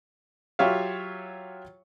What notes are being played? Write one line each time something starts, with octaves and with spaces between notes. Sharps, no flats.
F#3 F4 G4 C#5 E5 F5